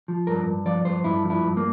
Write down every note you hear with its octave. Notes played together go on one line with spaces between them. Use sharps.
F3
G2 A#4
G2
F3 D5
G2 C5
G2 E4
F3
E4
G2
A#3